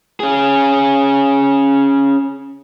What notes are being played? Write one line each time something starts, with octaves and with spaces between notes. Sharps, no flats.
C#4 G#4